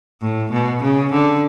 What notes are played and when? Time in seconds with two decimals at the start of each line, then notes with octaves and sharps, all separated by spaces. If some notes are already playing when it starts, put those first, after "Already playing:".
0.21 A2
0.52 B2
0.82 C#3
1.12 D3